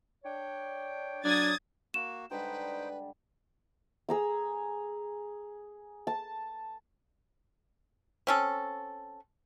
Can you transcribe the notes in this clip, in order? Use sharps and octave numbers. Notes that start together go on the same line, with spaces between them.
D4 C#5 G5
F#3 D4 D#6 G#6 A6
A#3 F#4 E7
D3 G3 G#3 D#4 B4 C5 G5
G#4 A#5 E6
A5
C4 C#4 A4